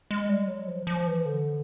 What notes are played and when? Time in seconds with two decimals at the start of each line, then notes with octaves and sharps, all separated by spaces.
0.11 G#3
0.29 G3
0.48 F#3
0.68 F3
0.87 F3
1.07 E3
1.25 D3